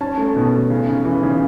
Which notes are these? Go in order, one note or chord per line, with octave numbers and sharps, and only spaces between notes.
C#4 A5
A3
A5
B2
A3
C#3
C#3
E3
C#3